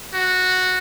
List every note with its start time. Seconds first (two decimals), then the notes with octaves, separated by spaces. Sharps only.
0.14 F#4